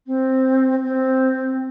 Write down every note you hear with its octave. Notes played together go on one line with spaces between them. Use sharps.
C4
C4